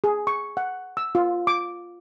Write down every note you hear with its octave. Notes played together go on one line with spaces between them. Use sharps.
G#4
C#6
F#5
E6
F4
D6